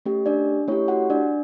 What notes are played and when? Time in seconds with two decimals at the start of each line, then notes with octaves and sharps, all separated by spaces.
0.06 A3 C#4 G4
0.26 D4 D5
0.68 A3 C#4 E4 G4 C#5
0.88 F#4 F#5
1.10 D4 D5